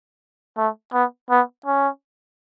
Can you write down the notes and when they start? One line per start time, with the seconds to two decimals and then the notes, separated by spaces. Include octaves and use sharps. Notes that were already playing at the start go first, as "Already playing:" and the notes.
0.57 A3
0.93 B3
1.30 B3
1.66 C#4